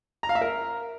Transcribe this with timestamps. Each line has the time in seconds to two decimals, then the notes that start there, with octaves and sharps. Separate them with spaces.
0.23 A#5
0.29 F5
0.35 E5
0.41 A#4